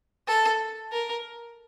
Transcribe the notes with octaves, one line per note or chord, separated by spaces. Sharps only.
A4
A#4